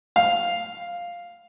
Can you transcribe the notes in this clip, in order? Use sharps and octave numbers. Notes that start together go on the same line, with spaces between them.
F5